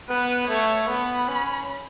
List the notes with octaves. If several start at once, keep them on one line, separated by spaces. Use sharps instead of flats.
B3 B4
A3 C#5
B3 B5
C#4